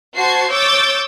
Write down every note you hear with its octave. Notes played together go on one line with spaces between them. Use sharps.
F#4 C5 A5 G#6 C7
C#5 D6 E6 G6 A6